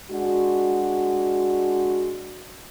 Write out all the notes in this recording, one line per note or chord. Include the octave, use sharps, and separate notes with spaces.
G#3 D4 F#4